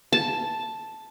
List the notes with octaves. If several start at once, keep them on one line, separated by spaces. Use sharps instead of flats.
A5